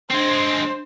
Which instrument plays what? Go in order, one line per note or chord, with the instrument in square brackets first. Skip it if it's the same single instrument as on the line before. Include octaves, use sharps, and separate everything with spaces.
[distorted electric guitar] G#3 C4 [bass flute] D4 [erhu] C5